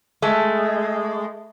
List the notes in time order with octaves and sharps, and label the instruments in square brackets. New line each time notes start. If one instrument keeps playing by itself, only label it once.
[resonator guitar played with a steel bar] G#3 A3